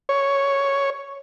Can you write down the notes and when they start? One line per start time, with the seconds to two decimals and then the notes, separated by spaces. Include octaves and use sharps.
0.09 C#5